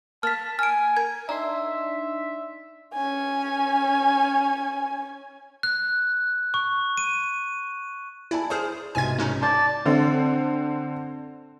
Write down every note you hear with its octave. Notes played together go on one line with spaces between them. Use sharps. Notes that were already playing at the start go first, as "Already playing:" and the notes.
A#3 A5 F6 B6
G#5 F6 D7
A#4 G#6
D4 D#4 E5 A#5 C6
C#4 G#5
F#6
C#6
D#7
E4 D5 G#5 A5
G#4 C5 D#6 F6
C2 G#2 B2 G#5 G#6
G#3 C#4 D#4
D5 A5 C6 G6 A6
D3 C4